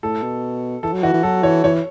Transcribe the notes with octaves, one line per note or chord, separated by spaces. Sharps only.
A2 A4
B2
E3 A4
F#3
E3 F#4
E3
F#3 A4
E3 C#5
E3 C#5